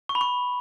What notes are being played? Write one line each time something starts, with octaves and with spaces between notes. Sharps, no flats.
C#6
B5
C#6